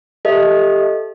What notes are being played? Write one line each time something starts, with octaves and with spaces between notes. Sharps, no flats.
G4 A4 D#5 E5